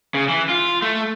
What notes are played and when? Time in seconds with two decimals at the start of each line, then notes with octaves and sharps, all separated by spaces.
0.14 C#3
0.28 E3
0.49 F4
0.82 A3